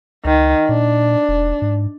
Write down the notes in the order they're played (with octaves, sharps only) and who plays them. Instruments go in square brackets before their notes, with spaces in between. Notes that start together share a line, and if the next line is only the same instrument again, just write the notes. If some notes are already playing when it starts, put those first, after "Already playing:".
[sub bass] C#2 [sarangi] D#3
[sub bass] A#2 [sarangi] D4
[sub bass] E1
G#2